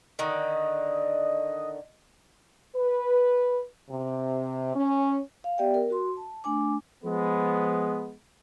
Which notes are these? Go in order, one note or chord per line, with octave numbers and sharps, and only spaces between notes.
D3 D#3 D#5
B4
C3
C#4
F5
B3 G4 D5 E5 G5
A#4
F#4 C6
A5
A3 D4 G#5 D6
F3 G#3 B3